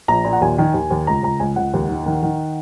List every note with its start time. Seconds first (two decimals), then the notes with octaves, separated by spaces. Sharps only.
0.08 A#1 A#5
0.25 A#2
0.33 F#5
0.41 D#2 G#5
0.58 D#3
0.74 D#2
0.90 D#2
1.07 C#2 A#5
1.23 C#2 A#5
1.40 C#2 G#5
1.56 C#2 F#5
1.73 D#2
1.89 D#3
2.06 D#3
2.23 D#3